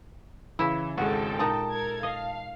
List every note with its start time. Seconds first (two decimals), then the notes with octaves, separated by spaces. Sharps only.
0.59 C#3 E3 E4 E7
0.98 G#1 G#3 F#4 A4 G5
1.39 A#2 G#3 D#4 A5
1.72 A4 A#4 G#6
2.03 D#5 F5